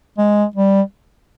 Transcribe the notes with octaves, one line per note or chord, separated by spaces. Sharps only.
G#3
G3